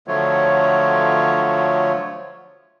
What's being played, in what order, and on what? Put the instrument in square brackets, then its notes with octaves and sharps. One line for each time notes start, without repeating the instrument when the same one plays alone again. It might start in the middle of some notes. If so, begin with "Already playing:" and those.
[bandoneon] D3 F3 F#3 A3 F4 C#5